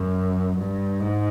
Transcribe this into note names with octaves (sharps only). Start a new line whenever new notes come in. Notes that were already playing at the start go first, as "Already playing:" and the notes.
Already playing: F#2
G2
G#2